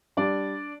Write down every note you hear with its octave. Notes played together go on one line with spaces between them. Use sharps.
G3 D4 D5